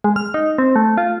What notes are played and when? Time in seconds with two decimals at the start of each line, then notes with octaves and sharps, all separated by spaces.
0.04 G#3
0.16 F6
0.34 D#4
0.58 C4
0.76 A3
0.97 F4